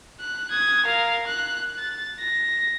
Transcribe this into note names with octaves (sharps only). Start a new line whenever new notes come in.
F#6
D#6 G#6
A#4 F5
F#6
A6
A#6